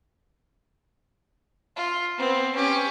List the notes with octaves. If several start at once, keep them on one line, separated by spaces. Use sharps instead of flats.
F4
B3 C4
C#4 G4